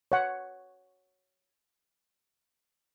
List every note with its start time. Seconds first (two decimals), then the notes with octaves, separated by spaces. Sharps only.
0.12 C#5 F#5